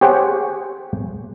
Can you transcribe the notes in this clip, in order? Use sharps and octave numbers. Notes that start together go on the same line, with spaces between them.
G4 G#4 C5 C#5 F#5 G5